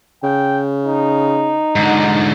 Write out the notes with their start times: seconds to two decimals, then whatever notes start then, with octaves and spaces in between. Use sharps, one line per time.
0.24 C#3 G5
0.84 D#4
1.76 G#2 D3